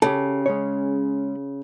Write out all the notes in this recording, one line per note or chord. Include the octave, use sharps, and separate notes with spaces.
C#3 G4 A4
G#3 C#4 C#5